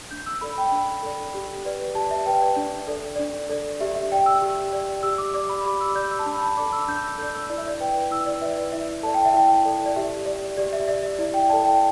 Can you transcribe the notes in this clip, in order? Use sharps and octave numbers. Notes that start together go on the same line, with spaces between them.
D4 G6
E6
A4 D5 B5
G5
D4
A4 D5
G4
B4 D5
G4 A5
D5
E5
B4 D5 G5
D5
D4
A4 D5
D4 D5
A4 D5
G4 E5
E5
D5 G5
E6
G4
D5
G4 E6
D6
D5 D6
B5
G4 D6
E6
D5 G6
E6
A5
D4 B5
A5
A4 D5 D6
E6
D4 G6
E6
A4 D5 G6
E6
E4 D5
E5
D5
B4 D5 G5
E4 E6
D5
B4 D5 E5
D5
E4 E5
A4 D5 A5
G5
E5
E4 G5
A4 D5
D5
G4 E5
D5
G4 D5
E5
D5 E5
E5
E4 D5
G5
A4 D5 A5
G5